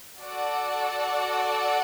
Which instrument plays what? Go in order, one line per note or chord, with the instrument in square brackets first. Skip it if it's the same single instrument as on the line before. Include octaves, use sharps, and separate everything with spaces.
[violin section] F#4 A4 D5 F#5